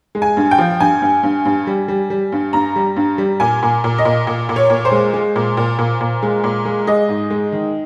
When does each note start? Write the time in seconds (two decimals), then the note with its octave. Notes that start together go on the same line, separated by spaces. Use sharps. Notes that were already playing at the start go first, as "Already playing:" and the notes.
0.15 G#3
0.22 G#5
0.37 G2
0.51 G5
0.58 F3
0.80 G2 G#5
1.02 G2
1.23 G2
1.45 G2
1.67 G3
1.88 G3
2.10 G3
2.32 G2
2.53 G2 A#5
2.76 G3
2.96 G2
3.18 G3
3.40 A#2 G#5
3.63 A#2
3.84 A#2
3.98 D#5
4.05 A#2
4.27 A#2
4.49 A#2
4.56 C#5
4.70 A#2
4.85 C5
4.92 G#3
5.14 G#3
5.36 A#2
5.57 A#2
5.79 A#2
6.01 A#2
6.23 G#3
6.44 A#2
6.65 G#3
6.87 G#3 D#5
7.09 G#2
7.30 G#3
7.52 D#3